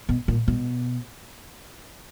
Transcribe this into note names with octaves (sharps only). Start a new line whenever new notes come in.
B2
A#2
B2